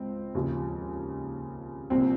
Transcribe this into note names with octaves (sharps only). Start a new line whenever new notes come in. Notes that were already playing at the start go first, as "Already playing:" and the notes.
Already playing: C#2 C4
D#2 C#3 F3
C2 A#2 F3 C4